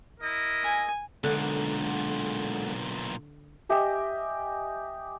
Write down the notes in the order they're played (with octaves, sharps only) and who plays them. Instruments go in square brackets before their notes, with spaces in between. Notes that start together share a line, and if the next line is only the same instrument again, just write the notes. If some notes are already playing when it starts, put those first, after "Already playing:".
[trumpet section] E4 A#4 D#5
[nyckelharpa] G#5
[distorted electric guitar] B1 A#2 [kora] D3 [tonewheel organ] G#3 A4 F#5
[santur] G4 D#5 E5 G#5